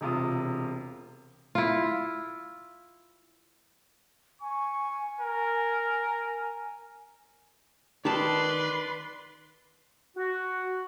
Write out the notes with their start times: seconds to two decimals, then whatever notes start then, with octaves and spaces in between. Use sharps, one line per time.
0.01 E1 C3 F4 D#6
1.55 E4 F4
4.42 G#5 C#6
5.21 A#4
8.05 D#3 G4 B4 D5 A5 C6
10.16 F#4